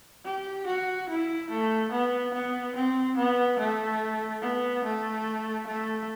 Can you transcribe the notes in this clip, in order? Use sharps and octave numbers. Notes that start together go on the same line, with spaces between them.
G4
F#4
E4
A3
B3
B3
C4
B3
A3
B3
A3
A3